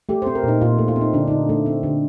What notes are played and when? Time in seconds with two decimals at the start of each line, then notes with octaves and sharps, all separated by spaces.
0.09 A3 G4
0.22 C5
0.27 C4
0.35 A#4
0.43 A#2 D#4
0.61 A#2 F4
0.78 A3
0.88 F4
0.96 C4
1.01 D#4
1.13 D3 D4
1.27 D3 D#4
1.49 A3
1.66 C4
1.83 D3